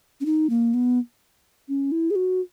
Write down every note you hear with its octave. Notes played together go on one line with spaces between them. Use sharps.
C#4
D#4
A#3
B3
C#4
E4
G#4
F#4